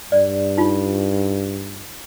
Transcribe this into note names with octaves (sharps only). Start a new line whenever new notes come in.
G2 D5
D#4 F4